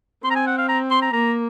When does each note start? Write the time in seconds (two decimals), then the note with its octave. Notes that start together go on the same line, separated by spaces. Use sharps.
0.24 C4 C6
0.31 A#5
0.36 G#5
0.47 F#5
0.58 F5
0.69 A#5
0.91 C6
1.02 A#5
1.13 A#3 A#5